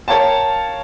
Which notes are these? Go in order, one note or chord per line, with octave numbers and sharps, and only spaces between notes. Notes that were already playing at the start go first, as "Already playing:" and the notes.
A#4 C#5 F5 G5 A5